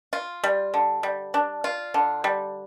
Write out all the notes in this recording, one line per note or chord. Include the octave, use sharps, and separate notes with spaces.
F4
G3
D3
G3
D4
F4
D3
G3